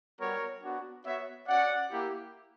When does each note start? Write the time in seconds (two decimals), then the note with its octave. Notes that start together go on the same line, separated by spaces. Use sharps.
0.19 G3 B3 F#4 A#4 C#5
0.63 B3 D4 F#4
1.05 B3 F#4 C#5 E5
1.48 C#4 F#4 D5 F#5
1.91 A#3 E4 G4